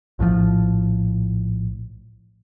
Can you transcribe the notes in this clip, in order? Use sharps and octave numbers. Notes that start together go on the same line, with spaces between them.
A#1 A2 C#3 F3